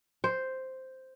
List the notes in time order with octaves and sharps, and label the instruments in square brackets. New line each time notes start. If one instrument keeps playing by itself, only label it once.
[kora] C5